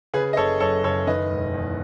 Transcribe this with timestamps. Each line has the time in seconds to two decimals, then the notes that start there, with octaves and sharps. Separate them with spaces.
0.14 C#3 G#4 B4
0.33 D#5
0.37 F#1 A4 C#5
0.60 F#2 A4 C#5
0.84 F#1 A4 C#5
1.07 D#3 B4 D#5
1.30 E1
1.54 E2